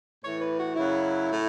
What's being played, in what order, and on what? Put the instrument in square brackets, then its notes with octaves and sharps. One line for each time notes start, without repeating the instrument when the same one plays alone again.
[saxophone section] A2 E3 C#5
B4
F#4
F#2 C#3 F#3 E4
A2